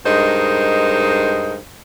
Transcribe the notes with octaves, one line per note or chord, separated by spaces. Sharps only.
G2 G#3 D#4 A#4 C5